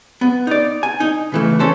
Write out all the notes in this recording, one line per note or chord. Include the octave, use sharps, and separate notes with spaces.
B3
D#4 D5
G#5
D#4
C#3 E3 A3
C#4 A4 C5